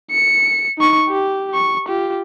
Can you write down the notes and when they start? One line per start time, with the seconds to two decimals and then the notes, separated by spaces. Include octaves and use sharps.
0.11 C#7
0.78 D#4 C#6
1.09 G4
1.54 C#6
1.88 F4 G4